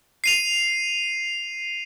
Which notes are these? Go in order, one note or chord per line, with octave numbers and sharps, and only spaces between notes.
C7 D#7 F7